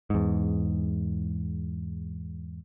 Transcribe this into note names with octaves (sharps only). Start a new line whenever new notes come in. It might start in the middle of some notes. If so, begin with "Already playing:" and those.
E2 G#2